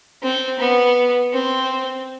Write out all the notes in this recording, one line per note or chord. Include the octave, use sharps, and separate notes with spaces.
C4
B3
C4